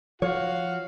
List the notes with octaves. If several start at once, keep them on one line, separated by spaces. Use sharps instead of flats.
F3 F#4 C#5 F5